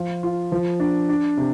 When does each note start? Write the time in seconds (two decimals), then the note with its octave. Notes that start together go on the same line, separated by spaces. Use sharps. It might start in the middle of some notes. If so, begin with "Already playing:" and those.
Already playing: F3 F4
0.23 F4
0.52 F3
0.80 D4
1.09 D4
1.37 C3